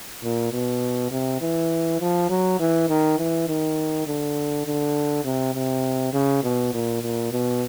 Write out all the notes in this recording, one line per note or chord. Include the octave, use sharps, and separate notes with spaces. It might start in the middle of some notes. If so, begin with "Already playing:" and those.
A#2
B2
C3
E3
F3
F#3
E3
D#3
E3
D#3
D3
D3
C3
C3
C#3
B2
A#2
A#2
B2